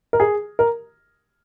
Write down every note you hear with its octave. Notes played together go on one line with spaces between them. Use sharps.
A#4
G#4
A#4